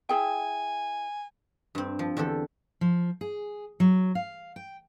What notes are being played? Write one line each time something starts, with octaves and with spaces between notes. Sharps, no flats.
E4 G#4 G5 G#5
G2 C4
F3
E2 D3 G4 A4
F3
G#4
F#3
F5
G5